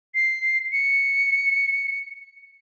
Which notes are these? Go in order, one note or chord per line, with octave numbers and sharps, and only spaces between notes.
C7
C#7